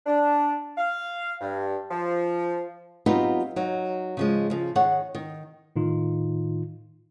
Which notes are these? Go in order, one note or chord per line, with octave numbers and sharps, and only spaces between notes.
D4
F5
G2
F3
F#3 B3 C4 D#4 F4 G4
F#3 D#4
C#3 F3 G#3
C#3 F3
D#3 G#4 C#5 F#5
D#3
A2 D#3 D#4 F4